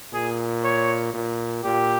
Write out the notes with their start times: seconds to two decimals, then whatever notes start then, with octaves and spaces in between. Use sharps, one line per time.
0.13 A#2 G#4
0.64 C#5
1.14 A#2
1.64 A#2 G4